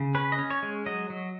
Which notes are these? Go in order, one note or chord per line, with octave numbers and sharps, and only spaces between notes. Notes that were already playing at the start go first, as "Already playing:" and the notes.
Already playing: C#3
C#4 B4
D#5
C#4
C#5
G#3
F#3 D#5
F#3